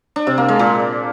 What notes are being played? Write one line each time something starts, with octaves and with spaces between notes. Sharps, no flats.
D4
C3
A#3
G#3
A#2